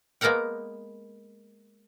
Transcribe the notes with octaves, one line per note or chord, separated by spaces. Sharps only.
G#3 A#3 B3 A#4 F#5 G5